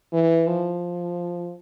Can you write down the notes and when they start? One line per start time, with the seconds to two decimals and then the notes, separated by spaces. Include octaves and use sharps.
0.13 E3
0.47 F3